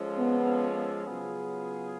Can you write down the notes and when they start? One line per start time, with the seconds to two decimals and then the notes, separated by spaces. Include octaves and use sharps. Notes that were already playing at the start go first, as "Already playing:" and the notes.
Already playing: F3 G#3 C#4 F4 A4
0.17 B3
1.05 C#3 F#3 B3 F4 G#4